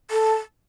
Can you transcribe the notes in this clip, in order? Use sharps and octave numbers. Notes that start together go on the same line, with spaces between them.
A4